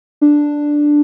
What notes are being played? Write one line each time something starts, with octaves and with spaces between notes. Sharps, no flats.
D4